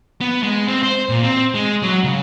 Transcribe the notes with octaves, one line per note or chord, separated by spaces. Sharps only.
B3
G#3
C4
C5
A#2
C4
G#3
F#3
C#3